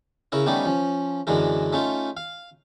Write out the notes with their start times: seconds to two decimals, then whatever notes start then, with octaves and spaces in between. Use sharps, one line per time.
0.32 C#3 E4 A#4 C#5
0.46 D#3 G3 A3 B3 C#4 D#4
0.65 F3 C#4
1.27 F#2 D3 E3 G#3 A#4
1.73 A3 C#4 D#4 F4
2.17 F5